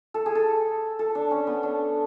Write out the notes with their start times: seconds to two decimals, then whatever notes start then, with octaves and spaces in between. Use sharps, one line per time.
0.14 A4
0.26 G#4
0.35 A4
0.99 A4
1.15 D4
1.31 C#4
1.47 B3
1.63 D4